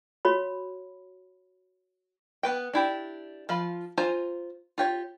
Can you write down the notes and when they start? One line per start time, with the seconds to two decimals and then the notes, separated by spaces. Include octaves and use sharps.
0.25 F#4 C#5 B5
2.43 B3 B4 G5
2.73 D4 E4 G4
3.49 F3 F4 B5
3.97 F4 C5 G#5 A#5
4.78 F4 G4 C#5